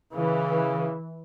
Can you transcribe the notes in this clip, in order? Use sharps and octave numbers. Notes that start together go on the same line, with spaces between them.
C#3 E3